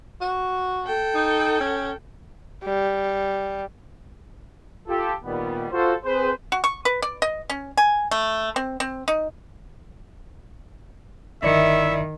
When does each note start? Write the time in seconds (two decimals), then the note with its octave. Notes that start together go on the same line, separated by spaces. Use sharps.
0.21 F#4
0.84 A4 G5
1.15 D#4
1.61 C#4
2.63 G3
4.88 F4 G4 A4
5.24 A#2 D#3 G3 B3
5.72 F4 F#4 A4 C5
6.04 C4 G#4 B4 C5
6.52 F#4
6.64 C#6
6.85 B4
7.02 D5
7.22 D#5
7.50 C#4
7.77 G#5
8.11 A3
8.56 C4
8.80 C4
9.08 D#4
11.43 G1 D#3 E4 D5 E5 C#7